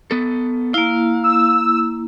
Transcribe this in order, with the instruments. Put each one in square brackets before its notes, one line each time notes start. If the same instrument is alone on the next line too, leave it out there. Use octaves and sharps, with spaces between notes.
[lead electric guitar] B3 A4
[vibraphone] A#3 E4 [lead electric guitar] F5
[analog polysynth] E6